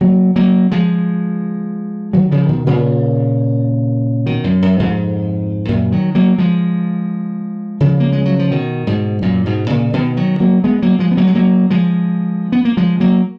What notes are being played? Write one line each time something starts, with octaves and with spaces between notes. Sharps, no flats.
F#3 A#3
F#3 A#3
F3 G#3
D#3 F#3
C#3 F3
B2 D#3
A#2 C#3
B2 D#3
F#2
F#2
F2 G#2
F#2 A#2
D#3 F#3
F#3 A#3
F3 G#3
C#3 F3
A#3
G#3
F#3
F3
B2 D#3
G#2 B2
F#2 A#2
G#2 B2
A#2 C#3
B2 D#3
D#3 F#3
F#3 A#3
G#3 B3
F#3 A#3
F3 G#3
B3
F#3 A#3
G#3
F#3 A#3
F3 G#3
B3
A#3
F3 G#3
F#3 A#3